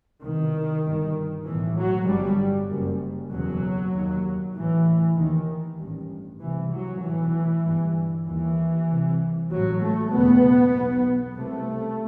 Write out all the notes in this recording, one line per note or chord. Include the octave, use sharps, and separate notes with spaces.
C2 B2 D#3
G1 G2
B1 A2 E3
F#3
G1 G2 G3
F#1 F#2
F#1 E2 B2 F#3
D#2
A1 A2 E3
D#2 D#3
A1 G2
C2 C3 E3
F#3
B1 A2 E3
G1 G2
D#2 E3
C2 C3
A1 A2 F#3
A3
F#1 E2 B2 B3
B1 B2
C2 C3 A3